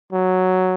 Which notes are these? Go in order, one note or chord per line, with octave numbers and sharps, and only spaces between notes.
F#3